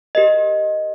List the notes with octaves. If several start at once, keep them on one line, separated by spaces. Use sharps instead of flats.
G4 A#4 D#5